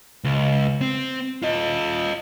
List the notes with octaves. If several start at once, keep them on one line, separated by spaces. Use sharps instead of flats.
C#2
C4
F4 D#5